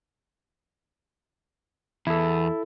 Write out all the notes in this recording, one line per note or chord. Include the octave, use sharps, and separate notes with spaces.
E2 E4 A4